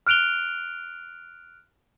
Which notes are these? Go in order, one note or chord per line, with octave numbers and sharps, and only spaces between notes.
F6 F#6 D7 F7 G7